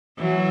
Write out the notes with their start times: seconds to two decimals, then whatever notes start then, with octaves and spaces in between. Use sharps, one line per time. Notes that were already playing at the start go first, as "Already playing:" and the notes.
0.19 E3 F#3